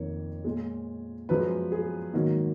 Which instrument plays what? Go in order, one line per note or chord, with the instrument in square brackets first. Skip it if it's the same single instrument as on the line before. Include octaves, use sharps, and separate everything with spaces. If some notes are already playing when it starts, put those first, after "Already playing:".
Already playing: [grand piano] F2 D#3 A#3 C#5
A#2 G#3
F#2 F3 G#3 B4
G#4
G#2 D#3 F#3 A#3